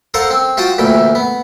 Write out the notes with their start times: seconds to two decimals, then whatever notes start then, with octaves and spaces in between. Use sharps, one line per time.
0.14 A4 A#4 C5 F5 F#5
0.30 C4
0.57 F4 F#4 G5 A5 D#6
0.78 D2 A#2 E3 G5
1.15 B3